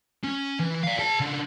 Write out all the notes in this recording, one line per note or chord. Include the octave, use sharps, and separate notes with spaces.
C#4
E3
D5 F5
G#4 A5
C#3 D4